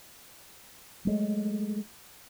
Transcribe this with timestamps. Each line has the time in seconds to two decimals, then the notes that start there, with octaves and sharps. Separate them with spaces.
1.05 F#3 G#3 A3